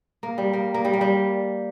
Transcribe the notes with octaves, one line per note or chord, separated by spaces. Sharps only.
A#3
G3
A#3
A#3
G3
A#3
G3